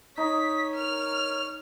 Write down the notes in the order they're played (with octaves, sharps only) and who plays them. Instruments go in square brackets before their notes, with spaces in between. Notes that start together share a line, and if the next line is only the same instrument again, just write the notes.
[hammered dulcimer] D#4 [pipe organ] C#5 [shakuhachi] D#6 [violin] B6
[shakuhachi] A#4 [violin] F6 F7